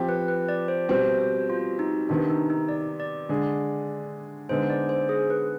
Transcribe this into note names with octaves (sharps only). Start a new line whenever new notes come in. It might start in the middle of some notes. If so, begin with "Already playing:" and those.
Already playing: F3 C4 G4
B4
B4
D5
C5
B2 G3 C4 C5
C5
F4
D#4
C3 D#3 B3 D4
D#4
D#4
D5
D5
D3 G#3 D4 G#4
D3 G#3 B3 D#4 C5
D5
C5
G#4
B4